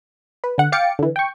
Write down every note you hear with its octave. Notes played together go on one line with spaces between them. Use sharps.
B4
D3 F#5
F5 G5 D6 A6 C#7
D3 E3
G5 C#6